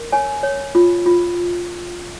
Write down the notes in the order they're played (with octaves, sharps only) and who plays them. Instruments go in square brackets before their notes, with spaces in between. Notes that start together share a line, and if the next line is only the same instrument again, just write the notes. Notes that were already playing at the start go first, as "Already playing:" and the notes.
Already playing: [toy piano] A#4
C#5 G#5
C#5
F4
F4